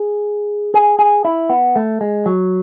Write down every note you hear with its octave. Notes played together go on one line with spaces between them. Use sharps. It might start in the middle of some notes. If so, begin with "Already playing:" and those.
Already playing: G#4
G#4
G#4
E4
B3
A3
G#3
F#3